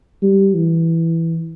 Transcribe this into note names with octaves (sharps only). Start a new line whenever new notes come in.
G3
E3